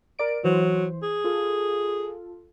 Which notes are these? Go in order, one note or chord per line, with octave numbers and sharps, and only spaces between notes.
A#4 D5 D7
E3 F#3 C5
G#4
F4 A4